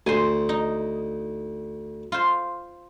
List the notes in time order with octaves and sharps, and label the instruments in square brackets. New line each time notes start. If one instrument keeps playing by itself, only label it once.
[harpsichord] D2 [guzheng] C5 G#5
[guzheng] D#4
F4 C5